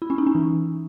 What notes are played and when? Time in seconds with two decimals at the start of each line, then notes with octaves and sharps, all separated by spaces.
0.02 E4
0.10 C#4
0.18 D#4
0.27 C#4
0.35 E3